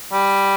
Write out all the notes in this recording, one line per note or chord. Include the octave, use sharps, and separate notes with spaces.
G3